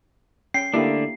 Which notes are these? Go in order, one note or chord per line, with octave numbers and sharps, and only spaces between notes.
C#4 G5 C7
D3 A3 A#3 D4 E4 G4